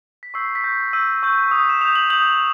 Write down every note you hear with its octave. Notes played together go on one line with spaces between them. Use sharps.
B6
C#6 E6 G6 C7
B6
C#6 E6 G6 A#6
C#6 E6 G6 D#7
C#6 E6 G6
D#6 G6
E7
D#6 G6 F7
F#7
D#6 G6 F#7